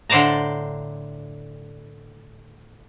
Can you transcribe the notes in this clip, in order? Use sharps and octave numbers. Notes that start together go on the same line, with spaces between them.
A2 D3 C5 D5 A5 A#5